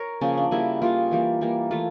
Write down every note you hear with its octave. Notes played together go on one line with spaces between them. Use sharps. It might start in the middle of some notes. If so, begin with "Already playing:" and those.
Already playing: A#4 C#5
C#3 F3 A#3 C#4
D4
C#3 G3 A#3 E4
C#3 G3 A#3 F4
E3 G3 A#3
E3 G3 A#3
E3 A3 F4